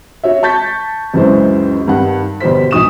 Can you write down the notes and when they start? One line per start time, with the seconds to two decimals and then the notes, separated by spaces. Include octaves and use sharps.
0.24 F#4 C#5 E5
0.43 A5 C#6 G6 A6 B6
1.14 C#2 F#2 E3 G#3 C5
1.88 G2 D#3 F#5
2.40 G1 B2 G4 C5 B6
2.71 B1 F#3 D#6 E7